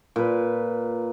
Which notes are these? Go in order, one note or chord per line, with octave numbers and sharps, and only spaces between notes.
A#2 B4